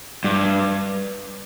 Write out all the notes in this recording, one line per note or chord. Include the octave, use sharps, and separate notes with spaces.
G2